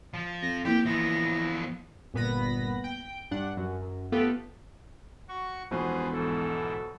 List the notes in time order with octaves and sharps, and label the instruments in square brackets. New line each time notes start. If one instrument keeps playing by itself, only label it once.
[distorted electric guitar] F3
[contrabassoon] F2 [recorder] A#6
[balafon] A#3 E4 [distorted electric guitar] G4 [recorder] G6
[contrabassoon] E3 [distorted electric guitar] F3 B3 [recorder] A#6
[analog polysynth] G1 A#2 B3 B4 B5 A#6
G5
G2 D4 F#5
F#2
F#2
A3 B3 F4 G4 A4 B4
[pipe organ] F#4 C#6
[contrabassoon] E1 [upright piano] B1 B2 F3 [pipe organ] G#4 B4 C5
[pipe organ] G#2 E3 [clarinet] A4